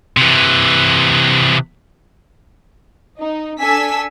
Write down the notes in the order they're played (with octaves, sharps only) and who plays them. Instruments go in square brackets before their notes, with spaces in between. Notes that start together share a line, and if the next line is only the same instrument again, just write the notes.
[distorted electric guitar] C3 E3
[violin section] D#4
D4 A4 G#5 E6 B6